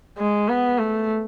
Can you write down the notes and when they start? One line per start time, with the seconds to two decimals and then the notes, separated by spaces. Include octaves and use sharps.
0.18 G#3
0.49 B3
0.79 A3